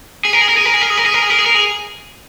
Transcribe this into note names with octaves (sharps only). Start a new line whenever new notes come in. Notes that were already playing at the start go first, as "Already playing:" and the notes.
G#4
A#4
G#4
A#4
G#4
A#4
G#4
A#4
G#4
A#4
G#4
A#4
G#4
A#4
G#4
A#4
G#4